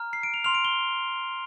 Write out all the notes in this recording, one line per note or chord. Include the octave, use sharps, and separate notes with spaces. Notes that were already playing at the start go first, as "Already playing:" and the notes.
Already playing: A#5 F6
C7
D7
F7
C6 F6 F7
D7
G7